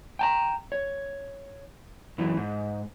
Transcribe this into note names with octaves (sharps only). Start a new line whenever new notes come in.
G5 A5 A#5
C#5
F#2 E3
G#2